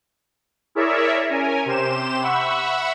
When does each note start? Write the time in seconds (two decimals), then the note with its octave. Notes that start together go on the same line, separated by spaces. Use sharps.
0.75 E4 G#4 A#4 C#5 D5 E5
1.30 C#4 A#4 G#5
1.65 C3 G4 C5 E7
2.22 E5 F#5 B5 C#6 E6